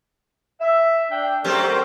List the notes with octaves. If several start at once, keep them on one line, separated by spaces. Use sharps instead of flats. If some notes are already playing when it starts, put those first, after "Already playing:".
E5
D4 G5
F#3 A3 C4 F#4 G4 A#4